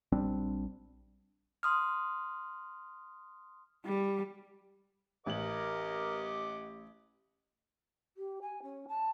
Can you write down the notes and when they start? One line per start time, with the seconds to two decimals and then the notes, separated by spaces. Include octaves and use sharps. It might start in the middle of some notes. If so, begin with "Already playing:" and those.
0.12 A#1 G3 C4 D4
1.63 C6 D#6 F6
3.85 G3
5.26 A1 G4 A#4 D#5 F#5 D6 F#7
8.15 G4
8.41 G#5
8.62 C#4
8.87 A5